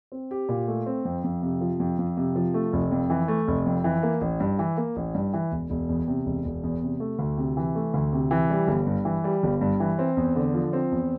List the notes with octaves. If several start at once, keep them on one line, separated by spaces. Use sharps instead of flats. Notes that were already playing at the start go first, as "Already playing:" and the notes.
C4
G4
A#2
A3
C4
F2
F2
C3
F3
F2
F2
C3
F3
A3
F1
F2
E3
A3
F1
F2
E3
A#3
A1
G2
E3
A#3
A1
G2
E3
E1
E1
E2
C3
E1
E1
E2
C3
A3
D2
C3
E3
A3
D2
C3
E3
G3
G1
G2
E3
G3
G1
G2
E3
C4
E2
D3
F3
C4
E2